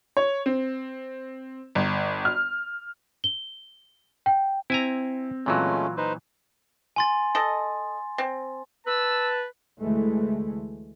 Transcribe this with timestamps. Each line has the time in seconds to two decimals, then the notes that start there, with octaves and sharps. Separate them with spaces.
0.17 C#5
0.46 C4
1.75 G1
2.25 F6
3.24 G7
4.26 G5
4.70 C4 E4 G#5 A#5
5.46 A#2 E3 F#3 G#3 A3 C#4 F4
5.97 D#4 B4 C5
6.96 G#5 C6 A6
7.35 A4 D#5
8.18 C4
8.87 B4 A5 E6
9.79 D2 E3 G#3 A3